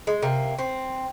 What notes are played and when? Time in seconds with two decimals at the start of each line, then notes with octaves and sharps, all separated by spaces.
0.07 G#3
0.22 C3 A#3
0.59 C4